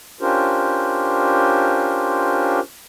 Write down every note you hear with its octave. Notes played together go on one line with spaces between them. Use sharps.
C#4 D4 F4 G4 A#4 C5